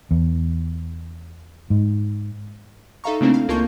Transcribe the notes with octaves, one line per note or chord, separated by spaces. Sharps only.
E2
G#2
D#4 A4 E5 F5 A#5 C#6
C#3 A3 A#3 C4 D4 E4
F5
C#2 A#3 F4 A5 C#6 G6